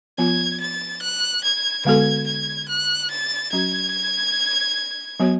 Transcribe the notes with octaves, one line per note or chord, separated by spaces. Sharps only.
F3 B3 F4 G#6
A6
F#6
G#6
D3 G#3 B3 F#4 A4 G#6
G#6
F#6
A6
F#3 C#4 F#4 G#6
F#3 B3 F#4 C#5